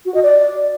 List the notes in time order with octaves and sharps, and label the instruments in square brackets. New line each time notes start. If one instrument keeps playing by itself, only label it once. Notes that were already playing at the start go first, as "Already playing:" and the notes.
[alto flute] F#4
D#5
D5